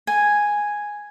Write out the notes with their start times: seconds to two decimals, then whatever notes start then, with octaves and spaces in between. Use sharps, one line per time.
0.07 G#5